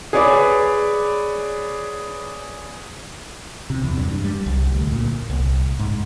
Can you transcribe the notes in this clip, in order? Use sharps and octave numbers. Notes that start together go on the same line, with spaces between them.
G#4 B4 C#5 D5 B5 D6
C3
E2
G2
G3
C2
D2
A#2
C2
G#2